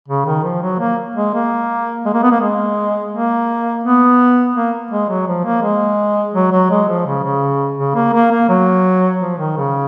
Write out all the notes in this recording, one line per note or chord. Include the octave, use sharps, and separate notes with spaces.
C#3
D#3
F3
F#3
A#3
G#3
A#3
G#3
A#3
B3
A#3
G#3
A#3
B3
A#3
G#3
F#3
F3
A#3
G#3
F#3
F#3
G#3
F3
C#3
C#3
C#3
A#3
A#3
A#3
F#3
F3
D#3
C#3